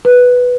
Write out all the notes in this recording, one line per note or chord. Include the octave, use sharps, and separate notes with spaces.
B4